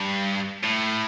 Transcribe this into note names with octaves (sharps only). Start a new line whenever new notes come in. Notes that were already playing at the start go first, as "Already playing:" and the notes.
Already playing: G2
A2